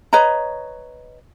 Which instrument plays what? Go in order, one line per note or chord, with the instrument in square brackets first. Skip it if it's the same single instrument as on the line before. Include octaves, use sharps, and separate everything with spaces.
[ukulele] B4 C#5 D#5 A#5